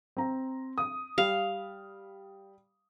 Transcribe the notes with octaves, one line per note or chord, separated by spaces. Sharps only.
C4 A#5
D#6
G3 F5